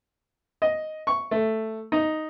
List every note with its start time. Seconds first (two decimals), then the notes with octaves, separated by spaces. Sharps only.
0.62 D#5
1.07 C#6
1.31 A3
1.92 D#4